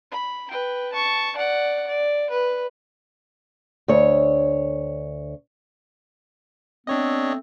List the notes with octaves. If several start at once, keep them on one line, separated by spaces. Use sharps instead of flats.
B5
B4 G5
A5 C#6
D5 F#5
D5
B4
D2 C#5
A3 B3 C4 D4 C#5 D#5